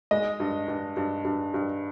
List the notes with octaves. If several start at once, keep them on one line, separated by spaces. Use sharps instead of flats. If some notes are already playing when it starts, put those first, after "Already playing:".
G#3 D#5
G2
G2
G2
G2
G2